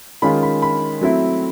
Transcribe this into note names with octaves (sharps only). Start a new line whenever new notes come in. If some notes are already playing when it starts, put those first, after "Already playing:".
D#3 G#3 C#4 F4 B5
B5
B5
F#3 A3 C4 E4